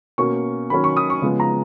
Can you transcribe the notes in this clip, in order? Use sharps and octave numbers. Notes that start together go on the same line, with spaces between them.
B2 A#3 C#4 C#6
D#3 F#3 C#4 B5
C#6
D#6
C#6
C#3 F3 G#3 B3
A#5